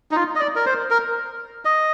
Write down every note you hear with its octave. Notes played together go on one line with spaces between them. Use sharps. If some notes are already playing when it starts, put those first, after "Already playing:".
D#4
F4
D#5
D5
A#4
C5
A#4
D#5